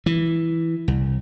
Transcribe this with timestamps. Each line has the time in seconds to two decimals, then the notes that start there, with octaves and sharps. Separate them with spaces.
0.06 E3
0.88 C2